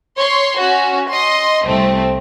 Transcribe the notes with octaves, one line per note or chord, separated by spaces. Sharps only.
C#5 C6
C#4 F#4
D#5 C6
C2 A3 C4